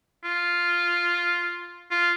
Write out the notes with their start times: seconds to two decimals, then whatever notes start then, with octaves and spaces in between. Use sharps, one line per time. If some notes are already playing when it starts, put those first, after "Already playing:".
0.24 F4
1.91 F4